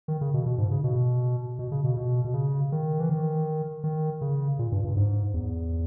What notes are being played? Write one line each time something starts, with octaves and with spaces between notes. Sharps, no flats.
D#3
C#3
B2
B2
G#2
C#3
B2
B2
C#3
B2
B2
B2
C#3
D#3
E3
D#3
D#3
C#3
A#2
G2
G2
G#2
E2